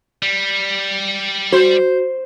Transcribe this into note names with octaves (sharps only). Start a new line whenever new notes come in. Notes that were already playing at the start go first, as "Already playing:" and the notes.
G3
F#4 C5